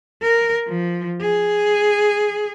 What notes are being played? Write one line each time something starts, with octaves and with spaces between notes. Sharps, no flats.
A#4
F3
G#4